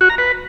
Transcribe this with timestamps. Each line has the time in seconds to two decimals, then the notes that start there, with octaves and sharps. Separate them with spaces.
0.01 F#4
0.10 A#5
0.18 B4